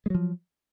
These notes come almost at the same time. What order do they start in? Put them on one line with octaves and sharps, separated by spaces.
G#3 F#3 F3